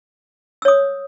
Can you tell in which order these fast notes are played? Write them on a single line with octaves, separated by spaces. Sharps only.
E6 C#5 D#6